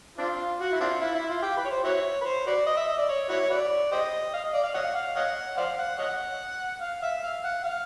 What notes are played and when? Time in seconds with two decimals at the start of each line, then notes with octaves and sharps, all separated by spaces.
0.18 C4 D4 F4
0.60 F#4
0.72 E4
0.81 C4 D4 F4
1.01 E4
1.15 E4
1.29 F4
1.42 G4
1.57 B4
1.65 C#5
1.70 C5
1.84 E4 F#4 C#5
2.21 B4
2.25 C5
2.47 F#4 B4 D5
2.66 D#5
2.77 E5
2.88 D#5
2.98 D5
3.09 C#5
3.29 E4 F#4 C#5
3.50 F#4 B4 D5
3.92 G4 C5 D#5
4.33 F5
4.44 D#5
4.54 D5
4.63 F5
4.74 C#5 D#5 F#5
4.95 F5
5.16 C#5 D#5 F#5
5.57 C5 D5 F5
5.79 F#5
5.98 C#5 D#5 F#5
6.81 F5
7.02 E5
7.23 F5
7.44 F#5
7.64 F5